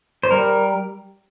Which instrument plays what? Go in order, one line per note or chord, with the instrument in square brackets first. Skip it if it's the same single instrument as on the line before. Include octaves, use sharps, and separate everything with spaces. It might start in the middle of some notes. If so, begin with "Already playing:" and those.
[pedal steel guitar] C5
G3 A#4